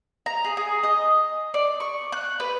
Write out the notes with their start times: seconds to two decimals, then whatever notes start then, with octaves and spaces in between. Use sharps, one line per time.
0.26 A#5
0.44 G#4
0.57 G#4
0.83 D#5
1.54 D5
1.80 C#6
2.12 F#6
2.40 B4